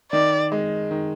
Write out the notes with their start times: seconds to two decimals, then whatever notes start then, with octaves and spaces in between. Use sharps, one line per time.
0.12 D#3 D5
0.52 G#3
0.91 D#3